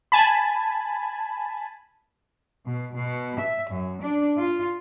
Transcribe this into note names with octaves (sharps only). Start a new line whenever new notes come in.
G#5 A5 B5
B2
B2
E5
F#2
D4
F4